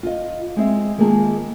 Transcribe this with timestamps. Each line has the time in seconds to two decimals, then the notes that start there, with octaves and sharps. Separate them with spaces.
0.03 F4 D#5
0.56 G#3 C4 E5
0.98 D#3 G#3 A#3 F4 G#4 A5